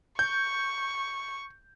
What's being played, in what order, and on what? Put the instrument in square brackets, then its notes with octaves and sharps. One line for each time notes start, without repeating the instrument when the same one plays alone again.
[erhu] C#6 [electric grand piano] G6